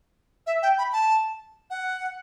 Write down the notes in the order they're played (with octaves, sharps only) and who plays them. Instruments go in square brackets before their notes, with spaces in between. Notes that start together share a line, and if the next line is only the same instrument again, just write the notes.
[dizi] E5
G5
B5
A5
F#5